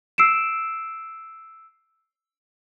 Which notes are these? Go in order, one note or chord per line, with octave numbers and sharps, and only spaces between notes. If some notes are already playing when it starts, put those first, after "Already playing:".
E6 C7 D7 E7